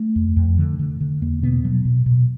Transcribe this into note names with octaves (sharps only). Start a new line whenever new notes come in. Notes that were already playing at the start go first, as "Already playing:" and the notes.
Already playing: A3
F2
F2
D3
D3
D3
E2 A#3
B2 B3
B2 F#3
B2
B2